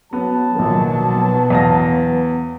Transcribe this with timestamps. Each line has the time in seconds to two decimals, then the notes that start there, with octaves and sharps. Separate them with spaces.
0.13 F#3 B3 A5
0.55 A#1 B2 D#3 F#3 A#3
1.15 B3
1.50 E2 F5 A#6